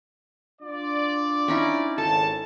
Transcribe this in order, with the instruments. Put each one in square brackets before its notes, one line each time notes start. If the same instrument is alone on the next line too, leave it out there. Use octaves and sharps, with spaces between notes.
[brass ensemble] D4 F4 D5
[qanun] C#4 D#4 E4
[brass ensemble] G#1 C#2 A5 [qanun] A4